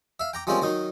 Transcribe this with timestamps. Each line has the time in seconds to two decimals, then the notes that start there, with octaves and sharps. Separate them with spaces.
0.20 E5 F5
0.34 G5 A#5 D6
0.47 F3 G3 G#3 A#3 C4 C#4
0.62 D#3 F#3 D#4